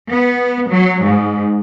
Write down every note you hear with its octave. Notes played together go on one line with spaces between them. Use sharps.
B3
F#3
G#2